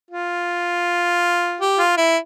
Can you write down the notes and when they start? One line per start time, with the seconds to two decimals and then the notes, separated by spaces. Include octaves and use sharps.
0.11 F4
1.61 G4
1.78 F4
1.98 E4